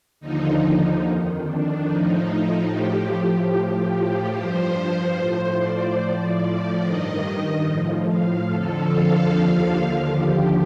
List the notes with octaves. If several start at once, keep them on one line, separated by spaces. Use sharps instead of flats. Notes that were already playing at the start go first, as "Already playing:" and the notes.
D#2 D3 F3 D#4
F2 D#3
D4
A2 F3 D#4
A2 F3 G4
G4
A2 F3 G4
G2 F3 C5
C5
A2 F3
D5
A2 F3
G2 D#3 D#5
A2 F3
F5
F2 D3 F3 A4
F5
D#2 D3 F3
F5
D#2 D3 F3 G4